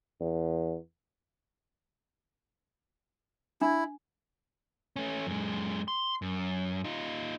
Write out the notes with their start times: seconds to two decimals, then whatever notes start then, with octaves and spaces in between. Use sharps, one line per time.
0.21 E2
3.61 D4 E4
4.96 A3 C#4
5.27 F#2 G#3
5.88 C6
6.22 F#2
6.84 D#4 F4